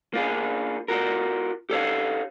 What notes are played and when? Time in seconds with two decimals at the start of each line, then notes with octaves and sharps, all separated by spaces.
0.13 A#3 F4 G#4
0.88 F4 F#4 A#4
1.70 G4 A4 C#5 F5